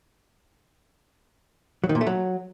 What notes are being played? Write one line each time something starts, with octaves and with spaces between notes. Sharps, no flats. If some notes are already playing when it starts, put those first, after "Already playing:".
F#3
D#3
A#2
A3
F#3